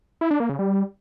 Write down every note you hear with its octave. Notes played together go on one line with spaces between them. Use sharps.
E4
D4
A#3
C#3
G3